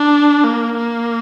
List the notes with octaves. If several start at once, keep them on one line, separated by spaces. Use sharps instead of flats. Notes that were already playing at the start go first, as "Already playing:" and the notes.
Already playing: D4
A#3
A#3